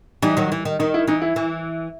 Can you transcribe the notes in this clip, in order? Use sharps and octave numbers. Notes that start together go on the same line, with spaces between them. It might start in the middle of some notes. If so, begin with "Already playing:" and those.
E3 G3 D#4
D#3 F#3
E3
D#3
D#3 D#4
E4
E3 D#4
E4
E3